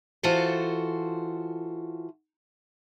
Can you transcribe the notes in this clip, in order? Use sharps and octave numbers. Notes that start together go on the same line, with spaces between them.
E3 F4 F#4 A4 C5